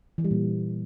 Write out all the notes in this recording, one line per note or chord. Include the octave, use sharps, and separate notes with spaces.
E3
G3
A#2